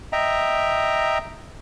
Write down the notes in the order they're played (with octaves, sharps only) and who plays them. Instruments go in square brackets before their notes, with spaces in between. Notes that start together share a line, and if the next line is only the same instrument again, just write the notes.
[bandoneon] D#5 E5 G5 A#5